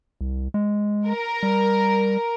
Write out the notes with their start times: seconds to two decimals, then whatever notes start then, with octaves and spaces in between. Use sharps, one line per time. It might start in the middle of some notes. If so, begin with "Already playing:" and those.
0.21 C2
0.54 G#3
1.09 A#4
1.43 G3